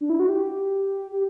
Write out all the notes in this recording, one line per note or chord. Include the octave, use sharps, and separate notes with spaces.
D4
E4
F#4
G4
G4